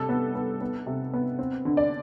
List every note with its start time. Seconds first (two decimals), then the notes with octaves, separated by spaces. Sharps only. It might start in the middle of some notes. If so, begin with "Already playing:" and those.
Already playing: C3 G3 A4
0.09 B3
0.35 B3
0.61 B3
0.86 C3
1.13 B3
1.39 C4
1.65 D3
1.77 D5